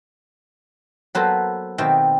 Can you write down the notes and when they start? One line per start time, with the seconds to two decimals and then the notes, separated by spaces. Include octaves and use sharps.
1.15 F#3 A#3 B3 A4 B4 C5
1.78 B2 D#3 C4 E5 G5